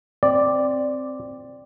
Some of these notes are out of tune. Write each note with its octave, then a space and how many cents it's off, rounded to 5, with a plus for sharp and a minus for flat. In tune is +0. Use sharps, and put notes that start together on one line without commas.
C4 +0 D5 +0